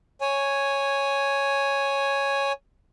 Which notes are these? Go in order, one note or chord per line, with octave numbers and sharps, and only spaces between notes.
C#5 G#5